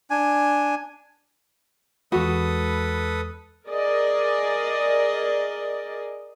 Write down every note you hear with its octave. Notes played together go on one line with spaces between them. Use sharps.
D4 G#5
E2 G#3 F#4 A4 B4 B5 D#6
G#4 A#4 D5 D#5